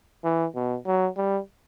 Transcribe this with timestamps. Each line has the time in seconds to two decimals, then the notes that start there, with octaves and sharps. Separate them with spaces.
0.24 E3
0.55 B2
0.86 F#3
1.17 G3